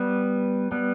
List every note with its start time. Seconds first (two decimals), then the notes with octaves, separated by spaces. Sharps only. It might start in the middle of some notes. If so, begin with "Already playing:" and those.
Already playing: G3 B3
0.72 G3 B3